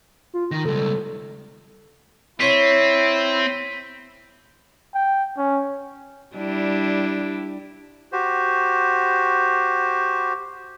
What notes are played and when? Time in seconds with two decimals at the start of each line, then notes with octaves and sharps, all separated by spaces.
0.34 F4
0.51 D#3 A#6
0.65 C#2 G3 A4
2.40 C4 E4 C5 C#5 B6 D#7
4.94 G5
5.37 C#4
6.36 G3 D4 E4
8.12 F#4 G4 C5